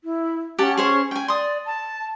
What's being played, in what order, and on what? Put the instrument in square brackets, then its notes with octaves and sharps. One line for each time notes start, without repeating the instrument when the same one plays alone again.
[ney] E4
[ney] C#4 [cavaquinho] G4 F#5 A5
[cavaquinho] G#4 C5 C#5
G5 G#5
[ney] D5 [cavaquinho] C6 D#6
[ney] A5